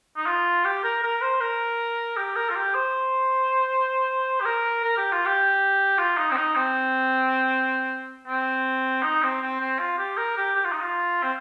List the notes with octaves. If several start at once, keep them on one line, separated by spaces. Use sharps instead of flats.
D#4
F4
G4
A#4
A#4
C5
A#4
G4
A#4
F4
G4
C5
G4
A#4
A#4
G4
F4
G4
F4
D#4
C4
D#4
C4
C4
D#4
C4
C4
C4
F4
G4
A#4
G4
G4
F4
D#4
F4
C4